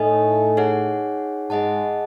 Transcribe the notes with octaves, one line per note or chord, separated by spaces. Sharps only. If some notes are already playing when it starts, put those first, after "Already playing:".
Already playing: A2 A3 D#4 A4 D#5 G#5
D#4 G#4 C#5 F#5
G#2 G#3 G#4 D#5 F#5 A5